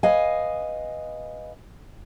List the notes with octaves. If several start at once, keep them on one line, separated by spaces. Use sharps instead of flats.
B4 D#5 F5 G#5